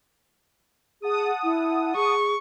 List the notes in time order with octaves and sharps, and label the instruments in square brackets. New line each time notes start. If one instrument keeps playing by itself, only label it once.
[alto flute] G#4 [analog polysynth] F#5 A5 D#6
[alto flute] E4
[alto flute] G#4 [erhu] C#6